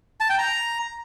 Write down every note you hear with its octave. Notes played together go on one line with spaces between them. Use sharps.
A5
G5
A#5